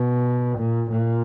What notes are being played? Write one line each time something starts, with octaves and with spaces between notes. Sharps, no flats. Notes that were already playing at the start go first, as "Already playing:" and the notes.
Already playing: B2
A#2
A#2